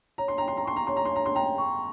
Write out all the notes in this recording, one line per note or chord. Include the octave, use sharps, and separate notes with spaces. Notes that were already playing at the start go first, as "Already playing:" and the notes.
C#5 A#5
C6
G5 A#5
C6
A#5
C6 C#6
A#5
C#5 C6
A#5
C6
C#5 A#5
C6
G5 A#5
C#6